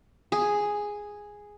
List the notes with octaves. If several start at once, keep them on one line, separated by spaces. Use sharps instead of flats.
G#4